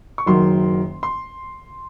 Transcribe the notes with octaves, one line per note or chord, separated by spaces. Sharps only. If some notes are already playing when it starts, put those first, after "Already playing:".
C#6
F#1 F#2 D#3 F#3 C6
C6